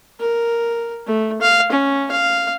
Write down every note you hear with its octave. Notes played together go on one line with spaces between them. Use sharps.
A#4
A3
F5
C#4
F5